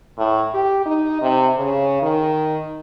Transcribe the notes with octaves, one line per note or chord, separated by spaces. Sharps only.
A2
G4
D#4
C3
C#3
D#3